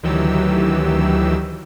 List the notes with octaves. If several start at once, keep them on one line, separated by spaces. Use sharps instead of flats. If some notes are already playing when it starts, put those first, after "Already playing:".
D2 D#3 E3 F#3 G4 E6